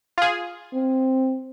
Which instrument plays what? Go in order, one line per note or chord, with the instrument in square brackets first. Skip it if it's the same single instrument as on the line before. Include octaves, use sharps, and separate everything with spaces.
[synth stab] F4 G#4
[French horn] C4